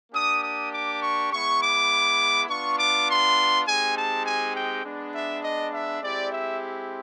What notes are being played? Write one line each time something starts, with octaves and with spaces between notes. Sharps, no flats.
A#3 D4 G4 D#6
D#6
D6
C#6
G#3 B3 E4 C#6
D6
B3 D4 F4 C#6
D6
C6
G#3 C4 D#4 G4 G#5
A5
G#5
G5
G#3 B3 D4
E5
D#5
E5
G#3 C4 E4 G4 D5
E5